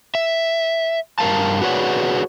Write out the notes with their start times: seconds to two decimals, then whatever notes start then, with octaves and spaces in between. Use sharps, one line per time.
0.15 E5
1.19 G2 A#4 F5 A5
1.62 F#4 G#4 B4 C#5 D5 F#5